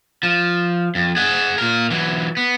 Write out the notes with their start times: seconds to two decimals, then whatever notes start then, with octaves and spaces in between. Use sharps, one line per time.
0.23 F3
0.95 F2
1.16 G#4 F#5
1.58 A#2 A#4
1.91 E3 F#3
2.37 B3